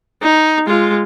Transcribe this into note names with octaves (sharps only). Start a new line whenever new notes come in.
D#4
G#3 F4